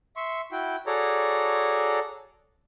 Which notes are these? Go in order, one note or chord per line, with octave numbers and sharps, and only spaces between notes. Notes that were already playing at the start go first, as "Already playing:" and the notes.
E5 C6 C#6
E4 F#4 G5
F#4 G#4 A4 C#5 D5 A#5